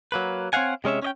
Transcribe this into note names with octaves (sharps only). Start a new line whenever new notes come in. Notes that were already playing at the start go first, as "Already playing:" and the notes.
F#3 A#3 B4
C4 C#5 D5 F5 F#5 G#5
C3 G#3 C#4 C#5 E5
C#4 D#5 G5